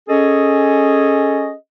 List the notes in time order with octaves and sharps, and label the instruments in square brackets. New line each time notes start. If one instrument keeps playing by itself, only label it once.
[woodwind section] C#4 G#4 A4 D#5